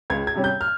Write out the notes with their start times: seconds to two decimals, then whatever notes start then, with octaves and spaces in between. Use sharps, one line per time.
0.10 C#2 G#6
0.27 G#6
0.35 C3 G3 C#4
0.44 G6
0.61 F6